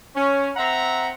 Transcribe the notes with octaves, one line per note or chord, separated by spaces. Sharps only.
C#4
C4 E5 F#5 A#5